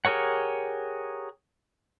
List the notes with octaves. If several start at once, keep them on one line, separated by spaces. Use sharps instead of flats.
G4 G#4 A#4 C#5 F#5